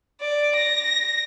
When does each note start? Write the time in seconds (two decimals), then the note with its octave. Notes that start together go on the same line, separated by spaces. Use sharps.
0.21 D5
0.56 A#6